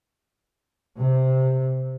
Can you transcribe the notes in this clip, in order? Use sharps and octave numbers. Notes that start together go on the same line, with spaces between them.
C3